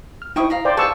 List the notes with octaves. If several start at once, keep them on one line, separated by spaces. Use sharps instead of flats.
F6
D#4 E4 C5 G5 C#6 D#6
F5 A#5 B5
C5 D5 G5
G#4 B4 F5 A5 C#6 E6